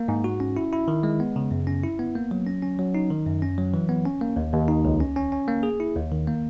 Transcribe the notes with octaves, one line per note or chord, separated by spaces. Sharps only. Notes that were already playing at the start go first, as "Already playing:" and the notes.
Already playing: A#3
G#2
F#4
C#4
E4
E4
D#3
G#3
B3
C#3
F#2
C#4
E4
B3
A#3
F#3
C#4
C#4
F#3
D#4
D#3
F#2
C#4
F#3
E3
B3
C#4
A#3
D#2
D#2
D#4
C#2
C#4
C#4
C#4
A#3
G#4
E4
D#2
D#3
A#3